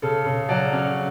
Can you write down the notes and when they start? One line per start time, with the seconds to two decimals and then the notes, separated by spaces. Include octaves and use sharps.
0.02 C#3 A4
0.26 C#3
0.49 F#3 D5
0.73 C#4